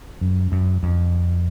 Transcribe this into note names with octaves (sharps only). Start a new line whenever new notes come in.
F#2
F#2
F2